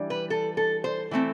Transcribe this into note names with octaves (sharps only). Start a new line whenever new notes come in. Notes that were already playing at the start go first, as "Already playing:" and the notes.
Already playing: E3 G3 D4
B4
A4
A4
C5
E3 A3 C4